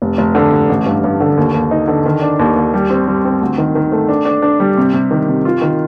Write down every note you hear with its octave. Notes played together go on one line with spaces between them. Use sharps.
F1
F1
D3
F1
A1
G2
G2
D3
D#2
D#2
D#4
D3
D#3
D4
D#2
D#2
G3
C4
G3
C4
D2
D#3
D#3
A3
D4
D4
D4
G3
C3
C3
D#3
C3
F4
D#3